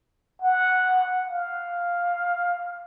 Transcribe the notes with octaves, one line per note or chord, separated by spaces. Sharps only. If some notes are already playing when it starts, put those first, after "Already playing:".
F#5
F5